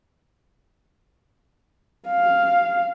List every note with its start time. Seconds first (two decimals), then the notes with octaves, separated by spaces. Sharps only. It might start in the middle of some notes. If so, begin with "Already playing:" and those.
2.09 F5